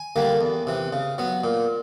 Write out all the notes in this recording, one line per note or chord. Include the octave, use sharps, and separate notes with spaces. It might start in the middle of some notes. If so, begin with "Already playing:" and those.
Already playing: G#5
D3 G3 A#3
E2
C3 E3
C#3
F#3 B3
A#2